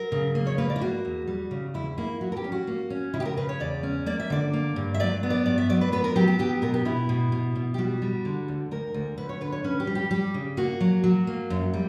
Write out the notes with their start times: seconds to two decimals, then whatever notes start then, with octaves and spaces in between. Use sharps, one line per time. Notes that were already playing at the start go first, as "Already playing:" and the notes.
Already playing: F#3 A#4
0.12 C#3
0.35 A#3
0.47 C#5
0.58 A#3 B4
0.70 D5
0.76 E4
0.81 A#3 F#4
1.05 E2
1.27 G3
1.51 C#3
1.74 E2 E4
1.98 A#3 E4
2.21 F#3 F#4
2.32 A#4
2.37 G4
2.44 C#4
2.52 F#4
2.67 A#3
2.90 C#4
3.13 C#3 E4
3.20 G4
3.25 A#4
3.37 C#3 B4
3.49 C#5
3.60 E2 D5
3.83 C#4
4.06 A#3 D5
4.20 E5
4.30 D3 D5
4.53 A#3
4.76 G2
4.94 E5
5.00 F#3 D5
5.23 B3
5.30 D5
5.46 G2 D5
5.58 E5
5.70 F#3 D5
5.81 B4
5.92 B3 B4
6.04 A#4
6.16 F#3 G4
6.28 G4
6.39 B3 G4
6.62 B2 A#4
6.74 G4
6.85 B2 E4
7.09 B2
7.32 B2
7.56 B2
7.74 G4
7.78 G3 F#4
8.02 G3
8.25 D3
8.48 D2
8.71 D2 A#4
8.94 D2
9.17 D2 B4
9.29 C#5
9.41 D3 B4
9.52 C#5
9.64 C#4 B4
9.80 G4
9.87 G3
9.95 G4
10.11 G3 G4
10.34 C#3
10.57 A#3 F#4
10.81 F#3
11.04 F#3
11.27 A#3
11.50 F#2
11.74 G3